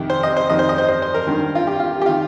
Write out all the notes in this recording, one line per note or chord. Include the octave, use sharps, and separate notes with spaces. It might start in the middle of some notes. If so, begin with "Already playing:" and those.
Already playing: F2 C3 D#3 G4
C5
D#5
C5
F2 D#3 D#5
C5
D#5
C5
C5
C5
A#4
G2 D#3
F4
G4
F4
G4
D#3 F4